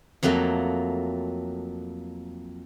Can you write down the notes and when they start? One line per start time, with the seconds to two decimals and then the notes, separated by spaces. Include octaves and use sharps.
0.23 F2 F#3 A3 A#3 F4